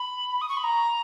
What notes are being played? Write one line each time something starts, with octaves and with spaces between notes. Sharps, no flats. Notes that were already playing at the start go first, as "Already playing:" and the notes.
Already playing: B5
D#6
C#6
B5
A#5